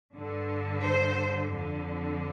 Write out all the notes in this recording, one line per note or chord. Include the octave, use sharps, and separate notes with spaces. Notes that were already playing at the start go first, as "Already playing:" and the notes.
G2 D3
C5
F2 D3